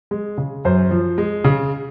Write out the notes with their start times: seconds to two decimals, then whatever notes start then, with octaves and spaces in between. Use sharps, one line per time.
0.11 G#3
0.38 C#3
0.65 F#2 C5
0.91 F3
1.18 G#3
1.44 C#3